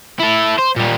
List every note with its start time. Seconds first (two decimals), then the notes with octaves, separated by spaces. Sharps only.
0.19 E4 A4
0.58 C5
0.76 A#2 G3